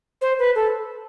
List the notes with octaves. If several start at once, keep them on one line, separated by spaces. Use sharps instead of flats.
C5
B4
A4